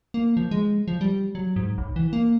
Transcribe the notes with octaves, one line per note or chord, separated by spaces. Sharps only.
A#3
F3
G#3
F3
G3
F#3
G#2
B1
E3
A#3